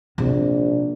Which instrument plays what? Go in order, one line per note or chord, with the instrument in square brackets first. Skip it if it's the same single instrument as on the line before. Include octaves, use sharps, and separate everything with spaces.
[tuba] A#1 [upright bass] C3 G3